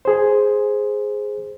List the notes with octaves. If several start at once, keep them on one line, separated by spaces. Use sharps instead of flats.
G#4 C5